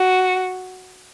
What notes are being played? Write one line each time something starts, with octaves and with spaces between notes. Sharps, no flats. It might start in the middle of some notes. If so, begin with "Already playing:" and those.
Already playing: F#4